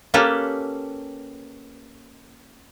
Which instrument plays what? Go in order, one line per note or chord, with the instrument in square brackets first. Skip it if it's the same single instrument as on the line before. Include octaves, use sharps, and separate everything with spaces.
[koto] A#3 C#4 G4 A4 B4